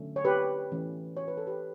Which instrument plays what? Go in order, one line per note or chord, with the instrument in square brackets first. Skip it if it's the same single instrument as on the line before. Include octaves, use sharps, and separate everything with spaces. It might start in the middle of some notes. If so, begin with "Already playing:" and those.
Already playing: [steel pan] D3 F#3 A3 C#4
C#5
G4 B4
E3 A3 C#4
C#5
B4
A4
G4 B4